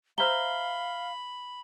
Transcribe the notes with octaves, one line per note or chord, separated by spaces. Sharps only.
C5 E5 F5 A#5 B5 F6 G7